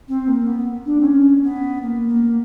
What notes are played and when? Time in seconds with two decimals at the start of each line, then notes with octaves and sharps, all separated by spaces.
0.09 C4
0.28 A#3
0.47 B3
0.86 D4
1.00 C4
1.05 C#4
1.44 B3
1.82 A#3
2.09 A#3